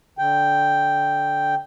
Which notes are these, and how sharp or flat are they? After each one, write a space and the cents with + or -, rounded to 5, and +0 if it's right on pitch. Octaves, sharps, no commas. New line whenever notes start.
D3 -10 G5 +0